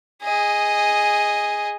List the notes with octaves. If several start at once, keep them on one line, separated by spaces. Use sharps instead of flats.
G#4 D#5